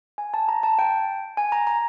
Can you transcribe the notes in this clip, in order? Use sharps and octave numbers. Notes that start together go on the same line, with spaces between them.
G#5
A5
A#5
A5
G5
G#5
A#5
A#5